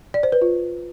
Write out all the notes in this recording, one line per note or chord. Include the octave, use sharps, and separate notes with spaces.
D5
C5
B4
F4